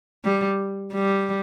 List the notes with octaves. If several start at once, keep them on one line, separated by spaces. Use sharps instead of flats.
G3
G3